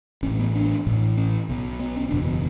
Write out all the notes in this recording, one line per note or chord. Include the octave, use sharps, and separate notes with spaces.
A1 A2 C#4
B3
D4
A1 A2
C#4
B1 B2
B3
C#4
F#1 E2 B2 D4
B3